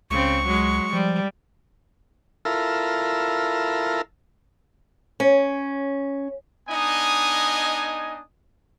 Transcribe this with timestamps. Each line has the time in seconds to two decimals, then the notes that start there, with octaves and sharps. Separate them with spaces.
0.10 C#2 C#3 C4 C#6
0.46 F#3 G#3
0.93 F3 G3
2.45 E4 F4 A4 A#4
5.20 C#4
6.69 B3 D4 D#4 D#5 G#5